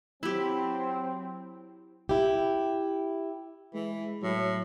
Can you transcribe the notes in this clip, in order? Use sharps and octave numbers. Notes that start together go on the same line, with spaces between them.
F#3 C4 E4 G4
E4 G4
E3 G#3
A2 F#3